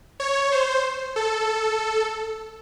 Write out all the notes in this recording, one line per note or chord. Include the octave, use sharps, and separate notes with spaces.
C#5
C5
A4